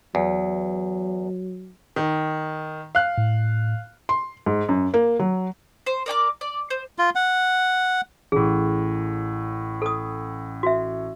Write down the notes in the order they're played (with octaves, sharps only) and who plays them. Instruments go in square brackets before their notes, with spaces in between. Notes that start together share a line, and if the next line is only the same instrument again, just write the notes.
[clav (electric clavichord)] E2 [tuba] F#3
[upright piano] D#3
F5 F#6
[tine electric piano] A2
[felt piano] C6
G#2
F#2
A#3
F#3
[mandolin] C5
A#4 D5 G5 D6
D5
C5
[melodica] F4
F#5
[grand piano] A1 A2 [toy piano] G#4
[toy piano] A4 D#6
F#4 E5